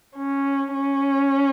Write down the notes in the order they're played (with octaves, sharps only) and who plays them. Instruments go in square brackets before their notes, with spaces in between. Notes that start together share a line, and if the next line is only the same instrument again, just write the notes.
[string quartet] C#4
C#4